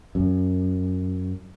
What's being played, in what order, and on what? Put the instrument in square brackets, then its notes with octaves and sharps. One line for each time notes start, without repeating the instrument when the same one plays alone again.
[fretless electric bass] F#2